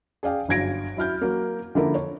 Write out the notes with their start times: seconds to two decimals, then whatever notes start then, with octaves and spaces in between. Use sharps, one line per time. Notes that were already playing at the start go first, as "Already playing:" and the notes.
0.23 G#4 D5 F5 G5
0.48 G1 F#2 F5 G#6 A#6 D7
0.97 F#3 E4 F6 G6
1.22 F#3 A#3
1.75 D3 F3 A#3 E4 A4 A#4
1.95 C#5